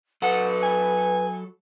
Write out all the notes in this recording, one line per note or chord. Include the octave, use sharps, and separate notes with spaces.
F#3 A4 B4 F#5
G#5